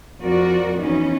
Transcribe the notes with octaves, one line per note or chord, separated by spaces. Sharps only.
F2 F3 F#4 A#4 D5
E3 B3 C#4 D#4